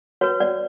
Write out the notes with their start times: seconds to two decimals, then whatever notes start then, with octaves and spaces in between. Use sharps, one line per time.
0.21 F#4 B4 C#5
0.40 D5